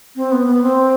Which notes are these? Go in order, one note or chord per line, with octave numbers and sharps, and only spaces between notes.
C4
B3
B3
C4